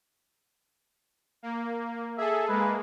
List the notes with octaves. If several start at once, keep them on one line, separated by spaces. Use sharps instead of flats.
A#3
G#4 A4 E5
G#3 A#3 B4